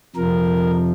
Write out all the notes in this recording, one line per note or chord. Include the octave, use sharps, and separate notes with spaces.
F2 C3 F3 A#4